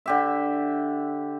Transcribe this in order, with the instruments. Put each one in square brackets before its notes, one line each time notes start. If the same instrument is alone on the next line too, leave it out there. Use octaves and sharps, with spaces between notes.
[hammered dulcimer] D3 G4 E5